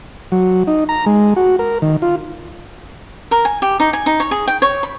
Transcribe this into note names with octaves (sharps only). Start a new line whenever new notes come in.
F#3
D#4
A#5
G#3
F#4
A#4
D#3
F4
A#4
G#5
G4
D#4
G#5
D#4
C#5
G#4
G5
C#5
B5